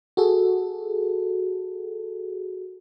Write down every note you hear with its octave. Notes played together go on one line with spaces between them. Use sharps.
F#4 G#4 A4